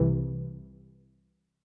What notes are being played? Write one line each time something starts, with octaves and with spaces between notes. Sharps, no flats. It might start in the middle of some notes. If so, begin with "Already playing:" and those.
Already playing: C2 C3 E3